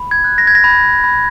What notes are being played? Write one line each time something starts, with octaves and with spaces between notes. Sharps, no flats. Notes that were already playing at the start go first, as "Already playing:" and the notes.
Already playing: B5
G#6
F#6
A#6
G#6
A#6
B5
B5